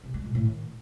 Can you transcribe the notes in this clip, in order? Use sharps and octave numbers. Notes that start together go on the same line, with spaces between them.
C3
G#3
A#2
A2
D#3